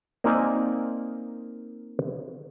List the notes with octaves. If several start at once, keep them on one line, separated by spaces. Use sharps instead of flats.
A#3 C4 D#4 A#4 D5 G#5